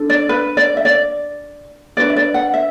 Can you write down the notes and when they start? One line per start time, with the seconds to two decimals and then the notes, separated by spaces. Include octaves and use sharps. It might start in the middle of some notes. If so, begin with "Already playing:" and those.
Already playing: D4 A4
0.10 D5
0.29 B4
0.57 D5
0.77 E5
0.85 D5
1.97 D4 F#4 B4 D5
2.10 E5
2.16 D5
2.34 F#5
2.54 E5